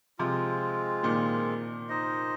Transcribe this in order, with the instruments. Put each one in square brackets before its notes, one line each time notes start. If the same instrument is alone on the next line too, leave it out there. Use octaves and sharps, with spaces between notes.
[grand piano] C3 F3 [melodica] G#3 C4 F4
[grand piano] A#2 D#3
[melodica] D#4 C5 D#5